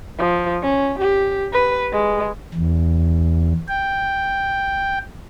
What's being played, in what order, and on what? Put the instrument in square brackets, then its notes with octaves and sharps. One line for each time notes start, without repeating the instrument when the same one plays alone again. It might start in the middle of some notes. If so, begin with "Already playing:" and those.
[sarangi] F3
C#4
G4
B4
G#3
[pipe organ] E2
G5